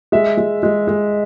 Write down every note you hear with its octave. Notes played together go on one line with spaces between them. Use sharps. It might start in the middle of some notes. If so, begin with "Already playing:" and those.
G#3 E5
G#3
G#3
G#3